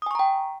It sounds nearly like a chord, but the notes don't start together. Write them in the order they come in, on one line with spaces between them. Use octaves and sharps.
D#6 G#5 C#6 A#5 G5